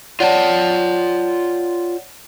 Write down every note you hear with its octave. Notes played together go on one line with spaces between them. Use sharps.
F4 C#5 D5 F#5 G5 A5